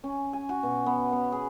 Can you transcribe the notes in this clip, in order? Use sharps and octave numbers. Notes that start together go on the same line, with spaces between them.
C#4
G#5
F#4
B2
B3
B3
G#4